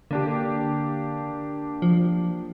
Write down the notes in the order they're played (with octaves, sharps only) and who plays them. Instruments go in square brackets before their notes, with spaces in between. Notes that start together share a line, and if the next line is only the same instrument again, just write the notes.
[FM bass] D3 [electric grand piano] A#3 D4 G4
[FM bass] F3